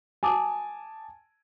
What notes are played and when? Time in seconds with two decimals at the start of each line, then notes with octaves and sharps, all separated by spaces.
0.23 G#5 A5 D6 D#6